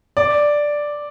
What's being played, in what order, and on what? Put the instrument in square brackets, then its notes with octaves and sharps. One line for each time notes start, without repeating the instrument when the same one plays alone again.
[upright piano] D5